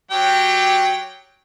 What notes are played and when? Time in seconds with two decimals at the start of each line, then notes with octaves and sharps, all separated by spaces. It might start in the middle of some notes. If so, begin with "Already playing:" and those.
0.11 F#3 G4 G5